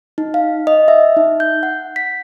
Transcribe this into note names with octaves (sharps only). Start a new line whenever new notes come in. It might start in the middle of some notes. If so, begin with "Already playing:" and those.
D#4
F5
D#5
E5
D#4
G6
F#5
B6